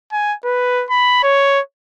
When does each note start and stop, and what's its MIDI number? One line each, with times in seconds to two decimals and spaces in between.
0.12 0.34 80
0.45 0.85 71
0.90 1.23 83
1.23 1.60 73